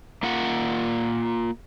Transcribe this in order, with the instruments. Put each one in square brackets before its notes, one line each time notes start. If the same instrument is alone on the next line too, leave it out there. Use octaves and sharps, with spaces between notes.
[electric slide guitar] A#3 F4 F#5